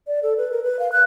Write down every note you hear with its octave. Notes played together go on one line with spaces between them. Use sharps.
D5
A4
B4
A#4
B4
F5
F#6